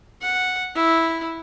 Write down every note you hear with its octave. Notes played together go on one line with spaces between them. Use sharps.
F#5
E4